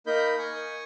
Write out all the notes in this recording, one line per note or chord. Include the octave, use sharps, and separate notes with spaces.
A#3 D#4 A#4 D#5 B5 G6
G#5 C#6 D#6